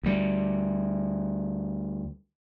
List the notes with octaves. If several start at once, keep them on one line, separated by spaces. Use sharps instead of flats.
D2 G3